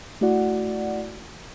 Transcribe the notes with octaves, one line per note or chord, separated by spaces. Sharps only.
A3 E4 F#4 D5 F#5